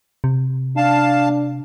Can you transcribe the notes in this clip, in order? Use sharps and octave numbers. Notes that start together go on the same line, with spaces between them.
C3
D4 F5 A5